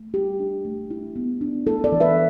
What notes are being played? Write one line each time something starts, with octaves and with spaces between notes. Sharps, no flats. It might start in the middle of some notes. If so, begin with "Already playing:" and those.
Already playing: A3
G3 G4
D4
A3
E4
B3
D4
E4 A4
A4 D5
E3
B4 E5